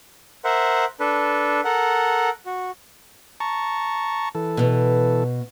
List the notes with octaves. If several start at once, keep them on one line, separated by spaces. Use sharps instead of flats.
A#4 C5 E5 F#5
D4 A4 B4
A4 A#4 F#5
F#4
A5 A#5 C#6
E3 A4
B2 B3